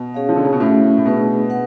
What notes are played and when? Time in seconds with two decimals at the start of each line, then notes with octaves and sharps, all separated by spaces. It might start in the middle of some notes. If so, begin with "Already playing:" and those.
Already playing: B2
0.14 C#4 G#4 C#5 F5
0.29 F3
0.36 D3
0.45 C#3
0.52 B2
0.60 A2 A3 C#4 F#4
0.97 A2
1.05 B2 A3 D4 G#4 B4
1.50 B4 F#5